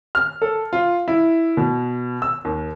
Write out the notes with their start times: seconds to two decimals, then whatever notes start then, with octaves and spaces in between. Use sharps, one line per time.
0.15 F6
0.42 A4
0.73 F4
1.08 E4
1.57 B2
2.22 E6
2.45 D#2